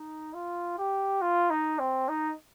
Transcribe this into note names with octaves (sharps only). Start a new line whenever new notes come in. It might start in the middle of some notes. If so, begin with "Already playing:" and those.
Already playing: D#4
F4
G4
F4
D#4
C4
D#4